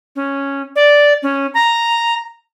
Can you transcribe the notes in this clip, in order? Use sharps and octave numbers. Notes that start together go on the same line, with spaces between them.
C#4
D5
C#4
A#5